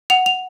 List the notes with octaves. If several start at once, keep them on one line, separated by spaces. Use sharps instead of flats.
F#5 F7
F7